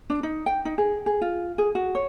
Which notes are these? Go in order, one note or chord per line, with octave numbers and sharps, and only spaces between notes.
D4
D#4
G5
D#4
G#4
G#4
F4
G#4
F#4
C#5